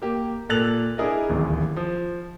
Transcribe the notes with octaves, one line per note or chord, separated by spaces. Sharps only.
A#3 G4
A#2 A4 F#6 A6 F7 F#7
D4 E4 G#4 A#4 D5 D#5
D1 A1 D#2
F3